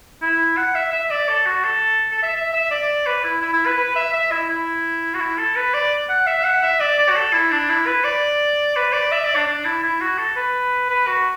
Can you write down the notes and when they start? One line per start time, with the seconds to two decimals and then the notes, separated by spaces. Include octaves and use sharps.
0.22 E4
0.57 F#5
0.75 E5
0.93 E5
1.11 D5
1.29 A4
1.46 F#4
1.64 A4
2.12 A4
2.23 E5
2.36 E5
2.53 E5
2.71 D5
3.07 B4
3.24 E4
3.42 E4
3.54 E4
3.66 B4
3.78 B4
3.96 E5
4.13 E5
4.32 E4
4.49 E4
5.14 F#4
5.21 E4
5.38 A4
5.56 B4
5.74 D5
6.09 F#5
6.27 E5
6.44 F#5
6.63 E5
6.80 D5
6.98 D5
7.09 F#4
7.16 A4
7.34 E4
7.52 D4
7.70 E4
7.87 B4
8.04 D5
8.76 B4
8.93 D5
9.12 E5
9.24 D5
9.36 D4
9.47 D4
9.65 E4
9.83 E4
10.01 F#4
10.18 A4
10.36 B4
10.90 B4
11.07 F#4